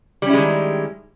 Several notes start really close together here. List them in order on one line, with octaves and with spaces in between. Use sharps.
G3 C#4 E4 G#3 D#3